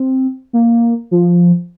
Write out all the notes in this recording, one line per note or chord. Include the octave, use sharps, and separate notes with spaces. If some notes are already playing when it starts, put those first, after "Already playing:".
Already playing: C4
A#3
F3